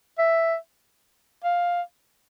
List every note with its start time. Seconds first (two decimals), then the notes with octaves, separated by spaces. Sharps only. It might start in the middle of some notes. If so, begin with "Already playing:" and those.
0.19 E5
1.45 F5